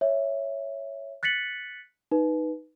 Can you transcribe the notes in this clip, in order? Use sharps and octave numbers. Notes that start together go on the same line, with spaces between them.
C#5 E5
F#6 A6 B6 C#7 F#7
D#4 B4